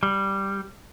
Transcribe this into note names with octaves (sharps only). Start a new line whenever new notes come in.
G3